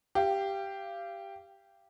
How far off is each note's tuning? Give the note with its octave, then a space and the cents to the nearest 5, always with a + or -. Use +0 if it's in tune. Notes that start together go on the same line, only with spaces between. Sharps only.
G4 +0 F5 -30